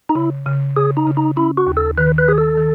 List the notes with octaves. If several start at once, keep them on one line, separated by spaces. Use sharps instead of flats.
D#4
C#3 E4
C#3
C#3 G#4
D#4
C#3
D#4
C#4 E4
F#4
D#2
A4
D#3 B4
B4
D#3 G#4
A4
D#3